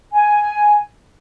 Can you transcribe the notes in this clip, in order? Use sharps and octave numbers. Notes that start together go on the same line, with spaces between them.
G#5